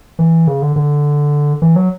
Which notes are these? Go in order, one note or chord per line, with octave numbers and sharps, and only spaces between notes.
E3
C#3
D3
D3
E3
F#3